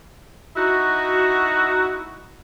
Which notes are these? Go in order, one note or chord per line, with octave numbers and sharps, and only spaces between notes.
D#4 E4 F#4